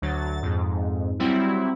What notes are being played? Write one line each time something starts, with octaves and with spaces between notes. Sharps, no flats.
D2 F#3 A6
F2 G#2
F#3 G3 C4 E4